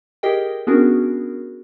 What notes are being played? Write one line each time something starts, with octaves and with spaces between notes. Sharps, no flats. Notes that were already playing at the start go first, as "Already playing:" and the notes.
G4 G#4 A#4 D#5 G5
B3 C#4 D4 F#4 G#4 A#4